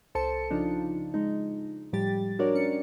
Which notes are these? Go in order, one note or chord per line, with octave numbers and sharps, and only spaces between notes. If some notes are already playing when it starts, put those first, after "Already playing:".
C2 A4 C5 A5 C#7
C#3 F3 D4 D#4 F4
G#3 D#4
A2 F3 G3 G4 A6
D4 F#4 A#4 C#5 D5
C#4 C#7